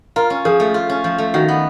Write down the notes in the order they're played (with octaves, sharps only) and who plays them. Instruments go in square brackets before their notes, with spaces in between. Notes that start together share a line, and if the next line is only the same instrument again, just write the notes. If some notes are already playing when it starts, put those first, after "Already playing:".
[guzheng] F4 [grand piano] A#4
[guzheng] C#4
[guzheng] F3 [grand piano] G#4
[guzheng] A3
F4
C#4
F3
A3
[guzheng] D#3 [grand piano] F#4
[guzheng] B3